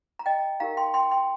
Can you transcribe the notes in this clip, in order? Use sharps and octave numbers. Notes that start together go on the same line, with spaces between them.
A#5
D#5 G5
D#4 G4 A#4 F5 A#5
G5 C6
G5 C6
G5 C6